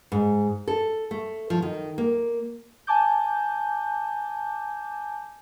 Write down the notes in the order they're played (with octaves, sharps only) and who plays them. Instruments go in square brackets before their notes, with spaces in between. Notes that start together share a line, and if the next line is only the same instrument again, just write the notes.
[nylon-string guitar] G#2
A4
A3
F3
D#3
A#3
[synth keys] G#5 A5 D6 G6